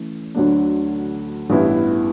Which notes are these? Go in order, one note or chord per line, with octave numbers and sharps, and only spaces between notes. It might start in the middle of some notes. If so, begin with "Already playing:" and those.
Already playing: E3 A3 C#4
D2 D3 F#3 A3 D4
A1 G2 E3 B3 E4